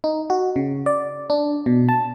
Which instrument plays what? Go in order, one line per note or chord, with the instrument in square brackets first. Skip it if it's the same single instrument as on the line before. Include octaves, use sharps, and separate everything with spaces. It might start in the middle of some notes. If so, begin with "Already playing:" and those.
[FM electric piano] D#4
F#4
C#3
D5
D4
B2
A5